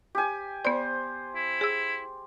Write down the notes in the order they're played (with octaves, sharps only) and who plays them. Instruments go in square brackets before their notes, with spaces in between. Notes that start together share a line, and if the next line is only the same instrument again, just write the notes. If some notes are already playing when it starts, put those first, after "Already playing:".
[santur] G4 G#5
[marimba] B3 D5 [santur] C5
[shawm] E4
[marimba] G#4 E6